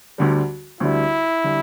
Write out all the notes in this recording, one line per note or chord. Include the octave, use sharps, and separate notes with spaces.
D2 D3 G3
D2 D3 G3 E4
D3 G3